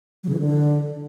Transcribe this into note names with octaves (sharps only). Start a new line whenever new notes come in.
F#3
C#3
E3
D3